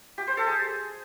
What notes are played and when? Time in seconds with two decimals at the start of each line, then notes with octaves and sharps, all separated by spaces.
0.18 G4
0.27 C5
0.37 A4
0.47 G#4